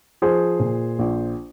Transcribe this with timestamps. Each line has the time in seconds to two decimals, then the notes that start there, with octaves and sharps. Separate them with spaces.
0.22 F3 G#4 C5
0.60 A#2
0.99 A#1